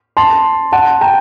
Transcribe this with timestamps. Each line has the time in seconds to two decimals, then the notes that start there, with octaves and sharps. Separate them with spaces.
0.17 A5 C6
0.72 F#5 A5
1.01 G5 A#5